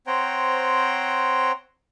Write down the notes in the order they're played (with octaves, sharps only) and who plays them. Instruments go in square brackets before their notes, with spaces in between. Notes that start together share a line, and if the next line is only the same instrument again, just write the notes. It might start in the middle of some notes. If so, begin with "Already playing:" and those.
[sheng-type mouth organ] C4 C5 C#5 F#5 G5 A#5